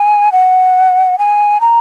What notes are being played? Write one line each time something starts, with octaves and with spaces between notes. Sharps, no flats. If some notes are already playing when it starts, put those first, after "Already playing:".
Already playing: G#5
F#5
G#5
A#5